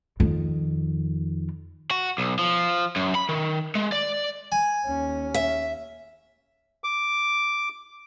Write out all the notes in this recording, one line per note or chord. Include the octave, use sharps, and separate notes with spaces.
F2 D#3
F#4
B1
F3
F#2
B5
D#3
G#3
D5
G#5
D#2 C#4
E5
D6